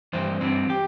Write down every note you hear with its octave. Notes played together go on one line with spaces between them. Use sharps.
G2 E3 C5
G2 E3 C4
G4